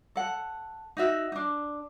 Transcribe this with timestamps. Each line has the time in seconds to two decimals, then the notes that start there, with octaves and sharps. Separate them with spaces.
0.16 A4 F#5
0.97 D#4 F#4 E5
1.32 D4 D#4